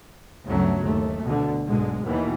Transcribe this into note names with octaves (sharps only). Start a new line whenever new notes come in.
G1 D2 C#3 F#3 A3
D#2 A3
D2 B2 D3
B1 G#2 D3 G#3
D#2 B2 D#3 E3